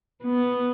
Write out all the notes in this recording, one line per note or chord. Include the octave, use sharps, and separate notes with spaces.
B3